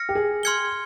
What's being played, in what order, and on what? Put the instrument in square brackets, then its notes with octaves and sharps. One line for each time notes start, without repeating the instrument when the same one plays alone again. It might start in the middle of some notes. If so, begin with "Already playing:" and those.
Already playing: [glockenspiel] F6 A#6 C#7
[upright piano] G4
G#4
[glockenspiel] C6 F6 G#6 C#7 G7